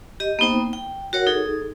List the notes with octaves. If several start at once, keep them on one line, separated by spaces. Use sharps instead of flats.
G4 D#5
A#3 B3 D#4 C5 G5
G5
F#4 A#4 C#5 F#5
D#4 G#4 A4